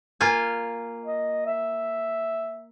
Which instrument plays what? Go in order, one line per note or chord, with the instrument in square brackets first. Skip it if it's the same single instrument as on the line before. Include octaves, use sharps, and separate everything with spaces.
[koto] A#3 F4 G#5
[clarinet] D#5
E5